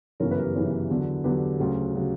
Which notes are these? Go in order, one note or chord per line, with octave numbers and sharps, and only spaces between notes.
G1 F#2 C#3 E3 A#4 C#5
G4 B4
A#4
G4 B4
G1 F#2 C#3 E3
E2 D3 F#3
E2 D3 F#3 G4 B4
D2 C#3 F#3
C#3 F#3